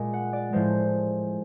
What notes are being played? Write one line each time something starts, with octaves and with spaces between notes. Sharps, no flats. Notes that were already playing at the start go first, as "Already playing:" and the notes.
Already playing: A#2 G#3
F#5
D5
A2 F3 G#3 C5